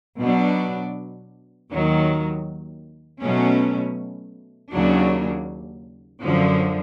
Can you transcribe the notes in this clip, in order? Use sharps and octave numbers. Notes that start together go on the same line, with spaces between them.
B2 F#3 B3 D4
D#2 D#3 F#3
B2 F#3 A3 C#4
D#2 C#3 F#3 A#3 D4
F#2 D3 F3